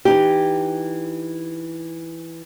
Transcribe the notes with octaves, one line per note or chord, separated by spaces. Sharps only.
E3 D#4 G4